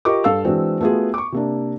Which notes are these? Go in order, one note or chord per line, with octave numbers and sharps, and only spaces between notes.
F4 G4 A#4 D#5 C#6 D6
G2 A4 F5 E6
E3 G#3 C4 D4 F#4
A3 B3 F4 F#4 G#4
C#6 D6
C3 A#3 D4